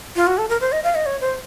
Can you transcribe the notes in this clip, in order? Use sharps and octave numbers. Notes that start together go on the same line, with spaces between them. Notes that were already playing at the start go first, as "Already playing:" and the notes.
F4
F#4
A4
A#4
C5
D#5
F5
D#5
C#5
C5